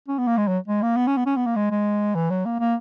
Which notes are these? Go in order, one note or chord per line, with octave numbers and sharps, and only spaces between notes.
C#4
B3
A#3
G#3
F#3
G#3
A#3
B3
C#4
B3
C#4
B3
A#3
G#3
G#3
E3
F#3
A#3
A#3